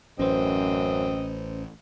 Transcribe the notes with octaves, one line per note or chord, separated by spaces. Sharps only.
A1 F#2 C4 C#4 B4 C5 D#5